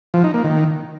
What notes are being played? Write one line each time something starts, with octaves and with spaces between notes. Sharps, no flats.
F3
D#4
A#3
D#3